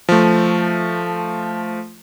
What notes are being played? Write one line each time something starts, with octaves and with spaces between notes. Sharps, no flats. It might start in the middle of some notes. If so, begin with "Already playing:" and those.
F3 A3